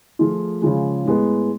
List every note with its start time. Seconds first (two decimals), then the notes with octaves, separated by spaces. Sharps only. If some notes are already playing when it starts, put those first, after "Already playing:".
0.19 F3 A3 F4 G#4
0.62 C#3 F3 G#3
1.05 A2 G#3 B3